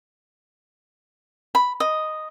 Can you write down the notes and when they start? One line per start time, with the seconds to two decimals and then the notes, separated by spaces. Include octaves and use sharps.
1.55 B5
1.80 D#5